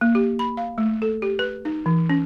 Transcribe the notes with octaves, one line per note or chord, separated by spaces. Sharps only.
A#3
G4
B5
F5
A3
A4
G4
B4
D#4
E3
C#4